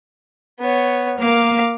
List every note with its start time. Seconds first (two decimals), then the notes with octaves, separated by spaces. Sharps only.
0.60 B3 C#5
1.18 A#3 F5 D6